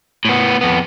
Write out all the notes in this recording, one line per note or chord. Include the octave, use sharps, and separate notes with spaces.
A2 B3
F2 B3